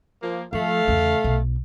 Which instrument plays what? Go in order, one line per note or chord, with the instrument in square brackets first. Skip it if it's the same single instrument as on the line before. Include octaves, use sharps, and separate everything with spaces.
[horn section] F3 A#3
[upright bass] F3 [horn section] A3 F5
[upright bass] E2 C#3
B1